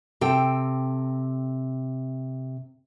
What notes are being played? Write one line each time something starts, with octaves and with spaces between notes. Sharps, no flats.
C3 A4 G5